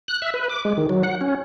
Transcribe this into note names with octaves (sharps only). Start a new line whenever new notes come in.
F#6
E5
B4
D6
G#3
D#3
F#3
F#5
C#4